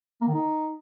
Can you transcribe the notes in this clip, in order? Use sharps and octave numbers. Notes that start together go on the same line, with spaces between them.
A#3
D#3
D#4